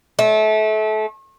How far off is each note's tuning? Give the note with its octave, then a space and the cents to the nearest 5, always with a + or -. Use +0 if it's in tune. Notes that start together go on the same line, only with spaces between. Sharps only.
A3 -30